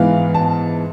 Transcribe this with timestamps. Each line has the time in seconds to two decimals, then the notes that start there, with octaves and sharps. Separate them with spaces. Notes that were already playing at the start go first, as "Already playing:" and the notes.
Already playing: G#2 E3 B3 F5
0.35 A5